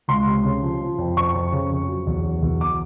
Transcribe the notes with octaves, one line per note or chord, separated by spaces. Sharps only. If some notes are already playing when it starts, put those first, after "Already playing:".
C#2 C6
C3
C#3
F3
F3
F2
F2 C#6
F2
C#3
F2
F#3
E2
F#3
E2
D6